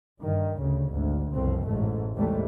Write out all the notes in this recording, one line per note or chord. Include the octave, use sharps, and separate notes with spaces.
G2 D#3
D2 C#3
G#1 D2
F#1 C2 F2 B2 C4
A1 G#2 A3
D#2 G#2 C3 E3 G3 A3